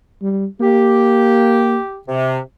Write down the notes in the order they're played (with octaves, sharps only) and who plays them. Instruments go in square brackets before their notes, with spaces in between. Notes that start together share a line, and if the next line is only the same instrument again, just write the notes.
[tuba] G3
[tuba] A#3 [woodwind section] G4
[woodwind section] C3